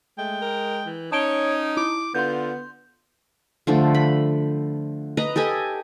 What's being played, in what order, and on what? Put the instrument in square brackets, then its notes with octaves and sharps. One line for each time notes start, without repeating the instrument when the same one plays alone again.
[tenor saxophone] G#3 [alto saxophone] A3 [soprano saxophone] G5
[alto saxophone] A#4
E3
[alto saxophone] C#4 [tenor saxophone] D#4 [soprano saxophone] C#5 [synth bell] A5 D7 G7
[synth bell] E4 [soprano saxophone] D6
[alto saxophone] D3 [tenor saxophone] B3 [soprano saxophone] F4 [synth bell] C6 G6
[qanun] D3 F3 A3
B5
B4 D#5 A#5
G4 A4 D#5 G#5